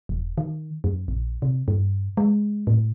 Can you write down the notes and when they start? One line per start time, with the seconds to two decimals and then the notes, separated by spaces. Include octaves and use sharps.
0.09 E1
0.38 D#3
0.84 F#2
1.08 A#1
1.42 C3
1.68 G2
2.17 G#3
2.67 A2